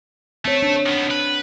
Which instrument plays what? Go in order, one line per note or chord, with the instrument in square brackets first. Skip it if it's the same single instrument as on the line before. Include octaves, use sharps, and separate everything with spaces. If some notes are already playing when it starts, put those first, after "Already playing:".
[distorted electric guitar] A3 [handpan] C4 C#5
[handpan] D4
[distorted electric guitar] D#3 B3
B4